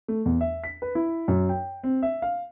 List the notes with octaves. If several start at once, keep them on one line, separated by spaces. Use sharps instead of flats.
A3
E2
E5
B6
B4
E4
F#2
G5
C4
E5
F5